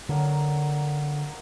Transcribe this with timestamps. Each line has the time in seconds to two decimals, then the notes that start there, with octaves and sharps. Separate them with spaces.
0.09 D3 F#3 A#3